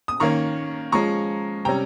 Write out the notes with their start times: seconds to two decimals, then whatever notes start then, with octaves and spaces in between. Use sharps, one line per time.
0.08 D#6
0.20 D#3 A#3 C#4 A#5 C#6
0.92 F3 G#3 C#4 A#5 C#6
1.65 C3 G3 C#4 G5 A#5